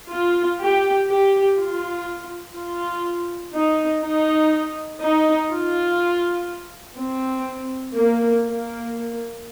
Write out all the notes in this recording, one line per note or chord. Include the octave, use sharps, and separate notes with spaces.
F4
G4
G4
F4
F4
D#4
D#4
D#4
F4
C4
A#3
A#3